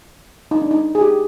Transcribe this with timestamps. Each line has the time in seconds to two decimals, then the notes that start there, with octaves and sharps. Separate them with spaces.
0.51 D#4
0.62 D4
0.71 D#4
0.95 G#4
1.01 G4